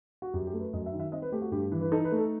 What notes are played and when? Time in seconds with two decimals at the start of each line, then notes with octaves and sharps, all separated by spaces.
0.22 F#4
0.34 F#2 G4
0.47 G4
0.53 A3
0.60 B4
0.73 F#2 D#5
0.86 E5
0.93 D#3
1.00 E5
1.12 C4 D#5
1.22 B4
1.32 A3 G4
1.42 F#4
1.51 G2 G4
1.72 E3
1.81 B4
1.92 D#4 A4
2.05 B4
2.12 A3
2.18 A4